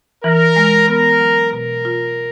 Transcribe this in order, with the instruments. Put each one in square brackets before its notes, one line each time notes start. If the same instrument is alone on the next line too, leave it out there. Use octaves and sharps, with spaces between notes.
[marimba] E3 [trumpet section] A#4
[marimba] G#3
[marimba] B3 [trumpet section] A#4
[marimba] F#3
[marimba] B2 [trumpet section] A#4
[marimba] F4